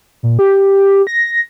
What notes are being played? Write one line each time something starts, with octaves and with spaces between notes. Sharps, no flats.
A#2
G4
A#6